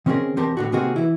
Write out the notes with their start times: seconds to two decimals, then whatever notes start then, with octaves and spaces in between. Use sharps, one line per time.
0.06 D#3 C4 C#4 F#4 G#4 A#4
0.36 E2 C4 G4 A#4 A5
0.57 A2 D3 F#4
0.72 C3 D#3 A#3 C4 F#4 G#4
0.96 E3 E4